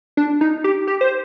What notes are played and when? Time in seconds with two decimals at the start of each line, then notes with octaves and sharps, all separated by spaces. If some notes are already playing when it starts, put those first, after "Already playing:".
0.17 D4
0.41 D#4
0.64 G4
0.87 G4
1.01 C5